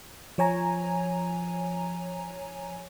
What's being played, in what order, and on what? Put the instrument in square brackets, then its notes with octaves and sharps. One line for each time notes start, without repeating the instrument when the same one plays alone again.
[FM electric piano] F3 C#5 G#5 A#5